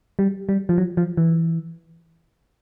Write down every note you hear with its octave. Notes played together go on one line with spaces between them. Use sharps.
G3
G3
F3
F#3
F3
E3